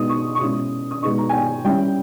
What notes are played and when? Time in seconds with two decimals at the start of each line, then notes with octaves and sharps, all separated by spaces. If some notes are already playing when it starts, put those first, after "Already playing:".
Already playing: B2 G#3 D#4 D#6
0.09 C#6
0.35 C#6
0.40 B2 G#3 C#4 E4 D#6
0.91 D#6
1.02 B2 G#3 B3 D#4 C#6
1.18 A#5
1.29 G#5
1.33 G5
1.65 G3 C#4 E4 G5